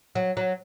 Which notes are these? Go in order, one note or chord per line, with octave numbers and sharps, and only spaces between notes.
F#3
F#3